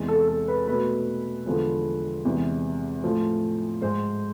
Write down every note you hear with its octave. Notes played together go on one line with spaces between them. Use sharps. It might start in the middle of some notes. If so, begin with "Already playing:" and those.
Already playing: E2 C3 E3 G#3
A4
A4
B4
B2 A3 B4
E2 D3 F3 G#3
E2 C3 E3 G#3
A2 F3 A3
G#2 G#3 C5